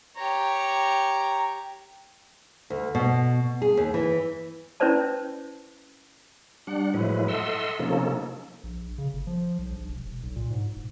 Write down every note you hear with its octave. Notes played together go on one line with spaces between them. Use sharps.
G4 C#5 A#5
D2
B2
G#4
D#2
E3
C#4 E4 B4 C5 D5 A5
G3 D4 F#5
A2 F3 F#3 G#3 E4 B4
A4 D#5 E5 F#5 C6 E6
C3 F3 A#3 C#4 D#4 A4
A#1
C#3
G1
F3
B1
A#1
E1
E1
B1
A#2
G#2
E1